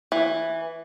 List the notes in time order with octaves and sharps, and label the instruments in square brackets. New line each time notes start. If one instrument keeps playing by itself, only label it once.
[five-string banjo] E3